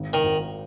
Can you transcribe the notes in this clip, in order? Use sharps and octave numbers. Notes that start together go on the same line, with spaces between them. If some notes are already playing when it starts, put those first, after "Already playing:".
Already playing: G#1
D#3
G#1